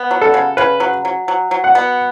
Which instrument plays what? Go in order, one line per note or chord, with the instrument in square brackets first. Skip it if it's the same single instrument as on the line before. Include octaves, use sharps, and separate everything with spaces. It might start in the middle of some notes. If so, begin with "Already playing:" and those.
Already playing: [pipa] B3
F#3
[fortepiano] A4
[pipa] C#3
[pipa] C#3 [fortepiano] B4
[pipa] F#3
F#3
F#3
F#3
[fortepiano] F#5
[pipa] B3